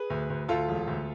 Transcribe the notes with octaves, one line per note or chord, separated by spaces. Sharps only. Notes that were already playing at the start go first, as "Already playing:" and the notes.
Already playing: G#4 B4
D2
D2
D2 F4 A4
E1
D2